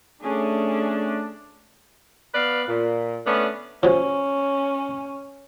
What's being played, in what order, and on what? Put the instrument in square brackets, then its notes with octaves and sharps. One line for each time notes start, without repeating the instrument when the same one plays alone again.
[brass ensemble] A3 D4 [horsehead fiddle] C#4 G#4
[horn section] B3 B4 D5 F5
A#2
A3 B3 C#4 D4
[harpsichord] F3 F#3 [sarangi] C#4